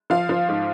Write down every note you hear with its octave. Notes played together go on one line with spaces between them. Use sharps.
F3 F5
F3
G#2